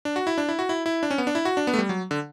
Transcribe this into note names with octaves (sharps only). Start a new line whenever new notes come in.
D4
F#4
E4
D4
E4
F#4
E4
E4
D4
C#4
B3
D4
E4
F#4
D4
B3
A3
G3
F#3
D3